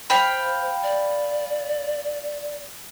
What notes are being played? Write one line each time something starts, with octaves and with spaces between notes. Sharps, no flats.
C5 F5 G5 B5
D5